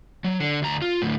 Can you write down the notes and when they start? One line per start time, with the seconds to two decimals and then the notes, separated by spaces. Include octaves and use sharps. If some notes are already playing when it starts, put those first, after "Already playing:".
0.24 F#3
0.40 D3
0.62 D2 A#5
0.82 F4
1.02 D2 A2